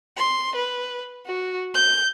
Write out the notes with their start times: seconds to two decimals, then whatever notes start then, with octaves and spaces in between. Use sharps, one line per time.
0.17 C6
0.56 B4
1.26 F#4
1.74 G6